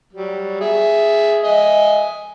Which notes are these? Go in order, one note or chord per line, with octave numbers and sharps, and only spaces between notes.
F#3 G3
G#4 E5
D#5 E5 G#5